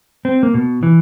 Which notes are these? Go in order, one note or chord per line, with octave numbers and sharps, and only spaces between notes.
C4
A#3
B2
E3